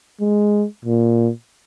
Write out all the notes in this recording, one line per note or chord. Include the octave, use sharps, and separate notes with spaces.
G#3
A#2